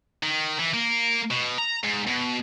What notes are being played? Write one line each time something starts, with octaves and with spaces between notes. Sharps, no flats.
D#3
E3
A#3
B2
A#5
G#2
B2